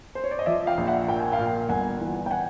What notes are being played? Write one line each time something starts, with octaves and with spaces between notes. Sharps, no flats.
C5
C#5
D5
D#5
F3 D5 E5
F5 G5
A#1
E5 F#5
A#2 G5
G#5
F5 G5
A#2
G1 F#5 G#5
E3
G5
F#5 G#5